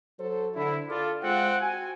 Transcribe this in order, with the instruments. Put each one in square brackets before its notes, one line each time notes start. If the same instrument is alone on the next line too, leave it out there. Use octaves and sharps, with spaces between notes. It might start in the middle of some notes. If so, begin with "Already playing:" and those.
[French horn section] F#3 A4 C5
[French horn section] D3 [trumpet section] E4
[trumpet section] F4 D5 F5 [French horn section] A4
[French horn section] G#3 F4 [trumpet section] C4 F#5
[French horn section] F#4 [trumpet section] G#5